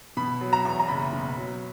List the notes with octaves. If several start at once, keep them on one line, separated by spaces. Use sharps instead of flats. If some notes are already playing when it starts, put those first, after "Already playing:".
B2 B5
F#3
A#5
E2
A#5
F#1 B5
B2
F#3